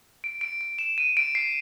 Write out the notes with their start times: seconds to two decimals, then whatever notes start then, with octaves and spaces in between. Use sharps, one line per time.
0.24 D7
0.41 D7
0.61 D7
0.79 E7
0.98 D#7
1.17 D7
1.35 C7